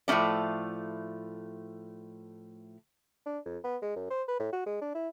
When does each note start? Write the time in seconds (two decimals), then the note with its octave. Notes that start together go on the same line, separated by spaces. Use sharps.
0.08 A2 F3 A3 C#4 D5
3.26 D4
3.45 F2
3.64 B3
3.82 G#3
3.96 F#2
4.10 C5
4.28 B4
4.40 A2
4.52 F#4
4.66 G#3
4.81 D4
4.95 E4